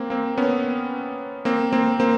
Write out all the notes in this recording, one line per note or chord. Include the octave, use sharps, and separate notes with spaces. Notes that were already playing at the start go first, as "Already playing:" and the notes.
Already playing: A#3 C4
A#3 C4
B3 C#4
A#3 C4
A#3 C4
A#3 C4